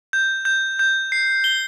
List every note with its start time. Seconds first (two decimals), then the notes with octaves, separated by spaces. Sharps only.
0.13 G6
0.45 G6
0.79 G6
1.12 C7
1.44 G7